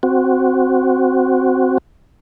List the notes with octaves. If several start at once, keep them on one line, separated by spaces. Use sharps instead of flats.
C4 F#4